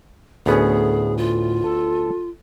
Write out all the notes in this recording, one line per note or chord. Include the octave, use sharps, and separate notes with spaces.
D2 A2 B3 C#4 G#4
F4
A4